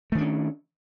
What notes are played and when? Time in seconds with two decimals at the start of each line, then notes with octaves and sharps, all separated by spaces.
0.12 A3
0.15 D#3
0.18 D4
0.21 C#4